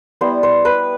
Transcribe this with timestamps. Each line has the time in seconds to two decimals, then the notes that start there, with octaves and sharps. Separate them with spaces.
0.21 G3 B3 E4 C5
0.43 C5
0.65 B4